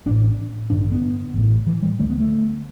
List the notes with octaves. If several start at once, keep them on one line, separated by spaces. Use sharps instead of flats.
A1 A2 D4
A1 G2 D3 D4
D4
B3
A1 A2
E3
G3
D2 D3 A3
B3
A3